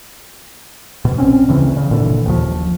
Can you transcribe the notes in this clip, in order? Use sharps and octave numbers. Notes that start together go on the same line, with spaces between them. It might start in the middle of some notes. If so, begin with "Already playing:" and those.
B2
A#1 C4 C#4
D2 C#3 E3 C4
C#3
G1 A#2 D3 E3
F#1 D#2 A2 F3